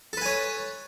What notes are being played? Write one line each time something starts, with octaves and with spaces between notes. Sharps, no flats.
A4 B4 C#5 G#5